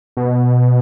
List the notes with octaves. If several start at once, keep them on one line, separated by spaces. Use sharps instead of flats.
B2